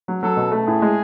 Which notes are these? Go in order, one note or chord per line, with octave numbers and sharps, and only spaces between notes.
F#3
F#3 A4
B2
A3
A2 G#4
G#3